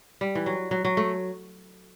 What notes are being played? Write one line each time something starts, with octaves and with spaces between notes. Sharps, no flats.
G3
E3
F#3
F#3
F#3
A3